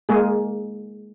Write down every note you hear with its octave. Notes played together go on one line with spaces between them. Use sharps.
G#3 A#3 G#4